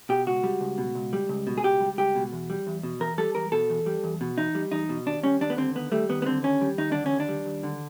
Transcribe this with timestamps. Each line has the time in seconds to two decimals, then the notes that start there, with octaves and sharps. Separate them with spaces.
0.09 B2 G4
0.27 C#2 F#4
0.43 G3
0.61 C#2
0.78 B2
0.95 C#2
1.13 G3
1.29 C#2
1.47 B2
1.58 G#4
1.63 C#2 G4
1.81 G3
1.98 C#2 G4
2.15 B2
2.33 E2
2.50 G3
2.67 E2
2.83 B2
3.00 E2 A#4
3.18 G3 A4
3.35 E2 A#4
3.52 B2 A4
3.70 E2
3.86 G3
4.04 E2
4.21 B2
4.38 E2 D#4
4.55 G3
4.72 E2 D#4
4.89 B2
5.06 D#2 D4
5.23 G3 C#4
5.41 D#2 D4
5.50 B3
5.57 D3 C4
5.75 D#2 B3
5.92 G3 A3
6.09 D#2 B3
6.22 B3
6.26 D3 C4
6.43 D#2 C#4
6.61 G3
6.78 D#2 D#4
6.92 D3 D4
7.06 C#4
7.12 D#2
7.20 D4
7.29 G3
7.46 D#2
7.63 D3